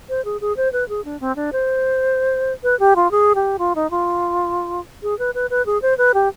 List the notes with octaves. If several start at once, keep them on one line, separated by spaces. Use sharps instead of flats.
C5
G#4
G#4
C5
B4
G#4
D4
C4
D4
C5
B4
G4
F4
G#4
G4
F4
D#4
F4
G#4
B4
B4
B4
G#4
C5
B4
G4